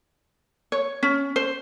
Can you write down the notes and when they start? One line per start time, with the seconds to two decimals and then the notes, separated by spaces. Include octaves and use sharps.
0.72 C#5
1.03 C#4
1.36 C5